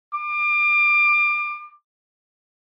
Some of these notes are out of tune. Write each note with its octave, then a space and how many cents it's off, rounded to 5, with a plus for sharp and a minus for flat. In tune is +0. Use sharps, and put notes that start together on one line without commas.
D6 +30